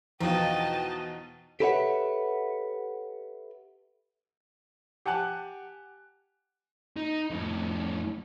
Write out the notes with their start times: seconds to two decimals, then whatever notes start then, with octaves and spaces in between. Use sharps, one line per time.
0.21 E2 B2 F3 D#4 D#5 G5 A5
1.60 G4 A4 B4 C#5 E5 F#5
5.06 G4 F#5 G#5 A5 F#6
6.97 D#4
7.31 F2 A2